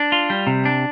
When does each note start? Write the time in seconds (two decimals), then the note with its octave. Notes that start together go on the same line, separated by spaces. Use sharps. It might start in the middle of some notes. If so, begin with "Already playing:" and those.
Already playing: D4
0.12 F4
0.30 G3
0.47 C3
0.65 D4